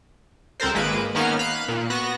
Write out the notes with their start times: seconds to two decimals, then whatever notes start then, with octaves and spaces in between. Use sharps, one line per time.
0.60 C#2 C4 A4 A#4 C5
0.74 G#1 G#3 A#3 B4 D7
1.15 D#3 A#3 B3 C#4 D#4 F6
1.39 F5 B5 F#6
1.68 A#2
1.90 B3 F#4 F#6 A#6